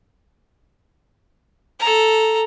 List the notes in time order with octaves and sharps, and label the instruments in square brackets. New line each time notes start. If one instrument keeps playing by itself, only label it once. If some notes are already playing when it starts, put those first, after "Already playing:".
[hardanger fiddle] A4 A#5